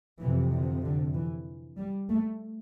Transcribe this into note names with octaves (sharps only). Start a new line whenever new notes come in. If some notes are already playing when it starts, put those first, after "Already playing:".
F2 C3 E3
D3
D3
E3
G3
A3